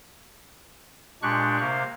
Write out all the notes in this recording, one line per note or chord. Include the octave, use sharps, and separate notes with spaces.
A#2 G#3 D4 G4 C#6 F#6
C3 A#3 C5 F5